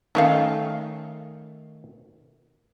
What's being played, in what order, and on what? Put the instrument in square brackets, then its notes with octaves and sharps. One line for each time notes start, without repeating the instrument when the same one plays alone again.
[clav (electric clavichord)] D#3 A3 D#4 [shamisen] C#4 A4 F5